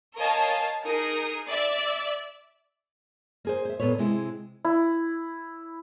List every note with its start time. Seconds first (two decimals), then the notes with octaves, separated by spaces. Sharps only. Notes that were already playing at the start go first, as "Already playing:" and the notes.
0.18 A#4 C#5 D#5 F5 G#5 A5
0.85 D#4 G#4 A#4 D#6
1.49 D5 E5
3.45 A#3 G#4 C5
3.65 C5 E5
3.80 A#2 B3 A4 B4 C#5
3.98 C3 G#3 E4 G#4
4.65 E4